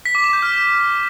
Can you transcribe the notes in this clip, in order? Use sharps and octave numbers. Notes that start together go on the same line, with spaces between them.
B6
D6
E7
G6
F6